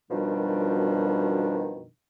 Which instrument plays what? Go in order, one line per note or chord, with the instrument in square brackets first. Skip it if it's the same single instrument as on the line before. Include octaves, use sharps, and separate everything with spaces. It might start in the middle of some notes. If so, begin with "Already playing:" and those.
[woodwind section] F#2 B2 D#3 F3 G3 D4